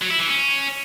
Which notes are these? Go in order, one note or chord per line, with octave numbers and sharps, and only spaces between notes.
F#3
E4
E3
C#4